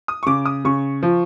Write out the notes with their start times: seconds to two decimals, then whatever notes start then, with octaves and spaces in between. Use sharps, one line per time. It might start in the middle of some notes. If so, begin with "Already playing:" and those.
0.08 D#6
0.23 C#6
0.26 C#3 D6
0.46 D#6
0.65 C#3 C#6
1.03 F3